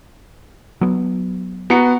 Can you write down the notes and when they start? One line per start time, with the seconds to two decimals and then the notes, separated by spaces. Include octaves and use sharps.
0.81 F#3 B3
1.70 B3 F#4 A#5 C#7